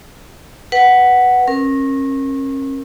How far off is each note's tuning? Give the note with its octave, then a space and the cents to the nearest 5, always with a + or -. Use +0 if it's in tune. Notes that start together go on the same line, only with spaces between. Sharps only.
B4 +0 F#5 +0
C#4 -35 A#4 +0